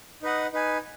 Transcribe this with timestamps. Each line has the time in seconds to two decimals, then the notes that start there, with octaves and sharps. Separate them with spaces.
0.22 D#4 B4 D#5 F#5
0.53 D#4 B4 G#5